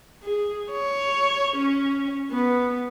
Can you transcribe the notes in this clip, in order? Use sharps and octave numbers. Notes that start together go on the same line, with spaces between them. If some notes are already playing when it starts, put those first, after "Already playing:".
G#4
C#5
C#4
B3